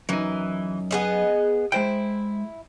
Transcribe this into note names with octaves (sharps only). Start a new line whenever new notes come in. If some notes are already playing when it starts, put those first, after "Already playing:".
F#2 E3 D#4
B3 G#4 D#5
G#3 E4 C5 G5